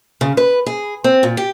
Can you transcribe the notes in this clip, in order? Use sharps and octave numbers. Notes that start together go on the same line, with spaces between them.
C#3
B4
G#4
C4
A#2
G4